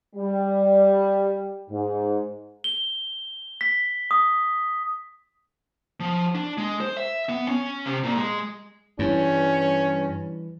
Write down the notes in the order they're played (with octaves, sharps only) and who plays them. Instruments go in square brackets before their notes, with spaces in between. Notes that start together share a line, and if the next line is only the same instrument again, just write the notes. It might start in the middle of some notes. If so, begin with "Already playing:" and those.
[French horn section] G3
G#2
[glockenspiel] G7
B6
D#6
[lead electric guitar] F3
D4
G#3
C5
E5
B3
C#4
C3
A#2
G#3
[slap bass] G2 [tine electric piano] E3 G3 B4 [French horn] C#4